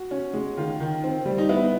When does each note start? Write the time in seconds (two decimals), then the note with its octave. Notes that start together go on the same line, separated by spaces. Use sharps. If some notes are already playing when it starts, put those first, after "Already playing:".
Already playing: F#4
0.11 C#4
0.33 G#3
0.57 D#3 F4
0.80 D#3
1.04 C4
1.25 G3
1.38 D#4
1.49 B3 E4